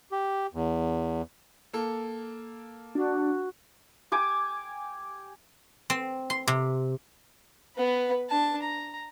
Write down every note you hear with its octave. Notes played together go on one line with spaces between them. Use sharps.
G4
E2
A#3 A4
D4 F#4
G4 G#5 D6
C4
C6
C3
B3 B4
D4 A5
A#5